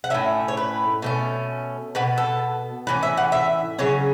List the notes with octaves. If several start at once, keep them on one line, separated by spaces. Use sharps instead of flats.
F#5
A2 A3 C#4 E5
C#5
B4
B2 A3 C#4
B2 B3 B4
A4
A2 E3 C#4 B4
E5
F#5
E5
C#3 F#3 C#4 C#5